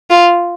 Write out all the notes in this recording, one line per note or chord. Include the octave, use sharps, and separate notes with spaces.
F4